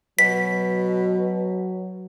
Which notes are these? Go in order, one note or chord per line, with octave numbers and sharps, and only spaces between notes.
B2 F#3 B6